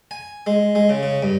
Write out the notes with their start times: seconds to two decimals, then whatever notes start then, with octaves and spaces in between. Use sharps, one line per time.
0.11 G#5
0.47 G#3
0.75 G#3
0.89 C#3
1.03 C#3
1.23 G2